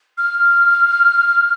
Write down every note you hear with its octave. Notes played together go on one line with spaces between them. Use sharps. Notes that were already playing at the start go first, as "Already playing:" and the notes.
F6